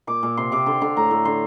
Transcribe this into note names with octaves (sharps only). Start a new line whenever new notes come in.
A#2 D6
A#2
C3 C6
C3 D6
D3 C6
D3 C6
A2 A#5
A2
D3 C6